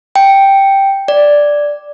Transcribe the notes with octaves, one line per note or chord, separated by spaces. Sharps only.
G5
D5